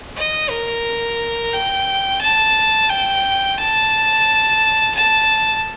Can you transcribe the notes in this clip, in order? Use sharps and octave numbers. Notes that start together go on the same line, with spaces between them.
D#5
A#4
G5
A5
G5
A5
A5